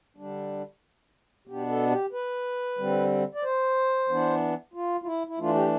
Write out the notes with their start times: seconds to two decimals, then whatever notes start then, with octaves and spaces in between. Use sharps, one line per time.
0.17 D3 G3 D4
1.47 B2 B3 D4 G4
1.69 A4
1.91 G4
2.13 B4
2.78 D3 G3 C4
3.35 D5
3.43 C5
4.09 E3 B3 D4
4.74 F4
5.02 F4
5.06 E4
5.27 E4
5.39 E3 A3 D4 F4
5.55 G4